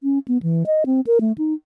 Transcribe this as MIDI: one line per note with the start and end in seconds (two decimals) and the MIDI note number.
0.03 0.19 61
0.28 0.38 59
0.43 0.63 52
0.66 0.84 75
0.86 1.01 60
1.07 1.19 70
1.21 1.32 57
1.38 1.54 63